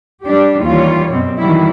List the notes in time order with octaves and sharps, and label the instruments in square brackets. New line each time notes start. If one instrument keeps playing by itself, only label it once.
[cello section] G3 D4 G4
D#2 E3 G3 F4 C#5
F#2 B2 C4
D#3 E3 F#3 G3 E4